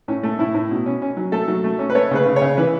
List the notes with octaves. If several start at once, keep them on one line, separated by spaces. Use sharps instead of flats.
A2 C#4
A3
A2 E4
A2
B2
C#4
C#4
F#3
A3 A4
F#3
A3
C#4
B4
A3 C#5
C#3 B4
C#3
C#5
C#3
E3 B4